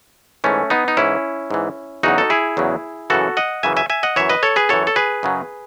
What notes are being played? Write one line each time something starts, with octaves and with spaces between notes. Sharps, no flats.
G#2 E3 A3 C#4
B3 D#4
D#4
G#2 E3 C#4 E4
G#2 E3
E2 C#3 F#3 D#4 F#4
A4
E4 G#4
E2 C#3 F#3
F#2 C#3 E3 F#4 A4
D#5 F#5
F#2 C#3 E3 E5 G#5
E5 G#5
E5 G#5
D#5 F#5
F#2 E3 C#5 E5
B4 D#5
A4 C#5
G#4 B4
F#2 E3 A4 C#5
A4
G#4 B4
F#2 C#3 F#3